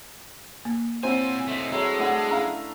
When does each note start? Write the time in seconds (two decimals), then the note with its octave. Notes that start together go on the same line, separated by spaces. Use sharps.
0.65 A#3
1.03 A#2 F#3 C4 E4 C5 G#5 B5
1.48 A3 D#4
1.72 F#3 G#3 A3 E4
1.99 A3 D4 E4 F#5
2.31 C#4 E5 F5 A#5